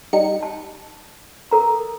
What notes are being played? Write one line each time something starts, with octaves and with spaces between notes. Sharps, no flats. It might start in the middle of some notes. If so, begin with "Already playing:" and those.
G3 D#4 C#7
A5
A4 A#4 A#5